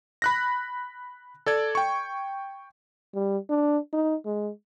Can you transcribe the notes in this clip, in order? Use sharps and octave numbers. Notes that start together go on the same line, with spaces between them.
B5 F#6 A#6
A4 D5 G#6
G5 C#6
G3
D4
D#4
G#3